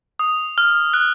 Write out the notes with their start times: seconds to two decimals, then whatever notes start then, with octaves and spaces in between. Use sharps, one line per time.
0.19 D#6
0.58 F6
0.94 F#6